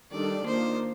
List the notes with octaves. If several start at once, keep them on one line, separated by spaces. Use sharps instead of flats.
D#3 G3 D4 A4 D5
D#3 A#3 D4 F4 C5